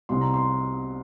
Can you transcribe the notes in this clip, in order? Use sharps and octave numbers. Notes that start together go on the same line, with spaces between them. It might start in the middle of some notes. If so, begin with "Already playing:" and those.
C2 C3 G3 C4 C6
A#5
C6